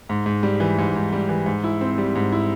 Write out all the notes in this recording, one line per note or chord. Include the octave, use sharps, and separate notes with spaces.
G#2
G#2
G3
E3
G#2
G#2
G3
E3
G#2
E4
C4
G3
G#2
E4